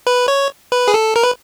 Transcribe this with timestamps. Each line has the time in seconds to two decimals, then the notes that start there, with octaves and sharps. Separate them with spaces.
0.07 B4
0.28 C#5
0.72 B4
0.88 G#4
0.94 A4
1.16 A#4
1.23 B4